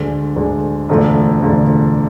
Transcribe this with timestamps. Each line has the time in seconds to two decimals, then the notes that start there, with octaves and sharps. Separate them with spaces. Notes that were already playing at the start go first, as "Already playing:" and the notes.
Already playing: D2 D3 G#3
0.36 D2 D3 G#3
0.89 E1 D2 D3 F3 A3
1.43 E1 D2 D3 F3 A3